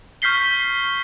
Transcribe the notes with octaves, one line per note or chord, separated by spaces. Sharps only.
C#6 F6 G6 B6 C7 G7